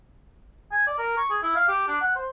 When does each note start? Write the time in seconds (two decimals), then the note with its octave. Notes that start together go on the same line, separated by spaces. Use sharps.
0.72 G#5
0.87 D5
0.98 A#4
1.17 C#6
1.30 G#4
1.43 E4
1.56 F5
1.68 G4
1.88 D4
2.01 F#5
2.16 C5